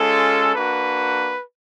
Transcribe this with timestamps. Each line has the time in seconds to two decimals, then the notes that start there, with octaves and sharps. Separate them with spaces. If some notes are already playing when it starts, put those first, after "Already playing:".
Already playing: G#3 C#4 F4 A4
0.55 A#3 D4 F#4 B4